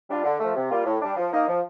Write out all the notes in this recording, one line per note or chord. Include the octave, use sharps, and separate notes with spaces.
G3 D4 F4
D3
F3 A3
C3
G3 A#3 F4
A2
G3 D4
F3
A#3 D#4
F3